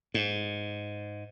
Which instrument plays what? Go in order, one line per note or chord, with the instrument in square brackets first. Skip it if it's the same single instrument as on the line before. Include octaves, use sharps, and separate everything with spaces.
[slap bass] G#2